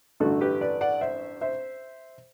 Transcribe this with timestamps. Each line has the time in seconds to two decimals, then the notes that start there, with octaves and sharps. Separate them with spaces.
0.20 A1 G2 D3 A3 F#4 A4
0.41 G4 B4
0.61 B4 D5
0.81 D5 F#5
1.01 C5 E5
1.41 C5 E5